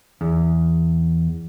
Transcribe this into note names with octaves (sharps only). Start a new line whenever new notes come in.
E2